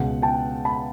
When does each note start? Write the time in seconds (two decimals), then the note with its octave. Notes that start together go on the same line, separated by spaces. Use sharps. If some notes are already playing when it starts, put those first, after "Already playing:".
Already playing: C#2 B2 G#3 F#5
0.22 G5 A5
0.65 A5 B5